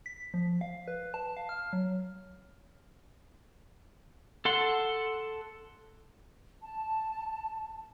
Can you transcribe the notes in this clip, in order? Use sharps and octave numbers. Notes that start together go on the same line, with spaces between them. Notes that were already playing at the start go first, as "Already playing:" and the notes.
B6
F3
F5
B4
A5
F5
F6
F#3
A4 F#5 C6
A5